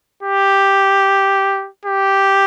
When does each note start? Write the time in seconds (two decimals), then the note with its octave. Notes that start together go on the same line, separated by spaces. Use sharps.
0.23 G4
1.85 G4